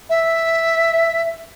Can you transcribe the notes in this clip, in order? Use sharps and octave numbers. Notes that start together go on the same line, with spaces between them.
E5